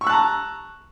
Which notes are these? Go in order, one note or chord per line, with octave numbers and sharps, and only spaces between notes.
A5 A#5 C#6 E6 F#6